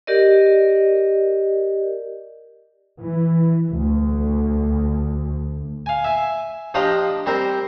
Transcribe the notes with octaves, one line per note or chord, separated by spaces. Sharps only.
G4 A#4 D5 D#5
E3
D2
F5 G#5
E5 G#5
F3 D4 F4 G4 D#5 A#5
G3 C4 A#4 C5